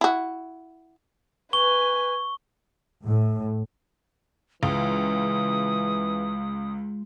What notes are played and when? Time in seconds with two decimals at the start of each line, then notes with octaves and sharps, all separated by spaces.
0.01 E4 F#4
1.53 B4 G#5 C#6 G7
3.06 A2
4.63 C#2 E3 G#3 F4 D#6